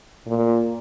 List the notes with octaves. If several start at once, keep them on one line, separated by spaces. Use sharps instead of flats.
A#2